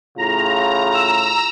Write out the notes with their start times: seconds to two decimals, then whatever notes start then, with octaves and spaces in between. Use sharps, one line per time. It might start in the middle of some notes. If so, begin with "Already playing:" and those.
0.18 A2 C#3 F4 A#5
0.91 A#5 E6